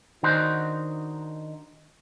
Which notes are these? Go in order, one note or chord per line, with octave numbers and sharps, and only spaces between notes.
D#3 D4 D#4 F#4 C5